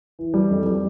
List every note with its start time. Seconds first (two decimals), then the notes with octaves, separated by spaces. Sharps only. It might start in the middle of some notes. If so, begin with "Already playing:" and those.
0.19 E3
0.34 G3
0.50 F2
0.66 G3